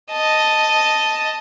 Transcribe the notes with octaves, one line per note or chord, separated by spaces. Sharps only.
D#5 A5